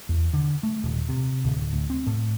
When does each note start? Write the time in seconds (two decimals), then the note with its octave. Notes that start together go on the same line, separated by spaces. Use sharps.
0.09 E2
0.33 D3
0.63 A3
0.84 D#1
1.09 C3
1.45 D1
1.73 D2
1.90 C4
2.07 A2